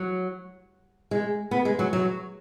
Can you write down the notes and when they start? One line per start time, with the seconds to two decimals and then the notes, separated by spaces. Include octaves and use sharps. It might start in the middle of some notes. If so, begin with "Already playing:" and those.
Already playing: F#3
1.11 G#3
1.51 B3
1.65 G#3
1.79 F#3
1.93 F#3